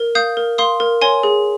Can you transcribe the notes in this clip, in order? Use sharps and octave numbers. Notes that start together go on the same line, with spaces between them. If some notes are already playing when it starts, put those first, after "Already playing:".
Already playing: A#4
F5 D#6 G6
A#4
F5 C6 D#6
A#4
C#5 G#5 C6
G#4